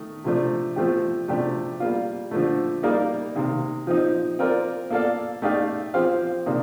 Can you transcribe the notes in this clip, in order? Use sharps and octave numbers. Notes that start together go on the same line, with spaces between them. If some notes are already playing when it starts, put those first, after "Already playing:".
Already playing: D#3 A3
C3 F3 A3 D4
F3 A3 C4 G4
C3 F3 A3 D4 G4
G3 A#3 F4
D3 F3 A3
G3 A#3 D#4 A#4 D5
C3 D#3 A#3
F3 C4 D#4
C4 F4 A#4 D5
A#3 F4 A4 D5 F5
A3 D#4 G4 D5 F5
F3 C4 G4 C5 F5
C3 D#3 A#3 D4